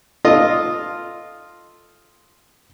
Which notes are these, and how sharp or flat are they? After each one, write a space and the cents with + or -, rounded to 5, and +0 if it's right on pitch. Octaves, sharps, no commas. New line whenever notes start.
F4 +0 A4 +0 D#5 +0